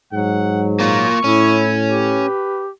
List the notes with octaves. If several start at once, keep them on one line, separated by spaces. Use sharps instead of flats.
G#2 F#3 F#5
A#3 F4 C#6
A2 C#4 E4
G4 B4